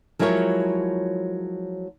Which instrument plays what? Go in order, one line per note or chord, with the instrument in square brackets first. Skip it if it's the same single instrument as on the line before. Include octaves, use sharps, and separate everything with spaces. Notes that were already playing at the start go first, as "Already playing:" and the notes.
[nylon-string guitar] F3 F#3 G#3 E4 A#4 C#5